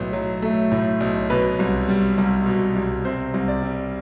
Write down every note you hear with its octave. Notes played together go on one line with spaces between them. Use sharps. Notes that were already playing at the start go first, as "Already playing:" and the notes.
Already playing: B1 A2 B4
F#3
A3
A2
B1
B2 B4
C2
G3
C2
B2
C2
C3 C5
C2
D5
G3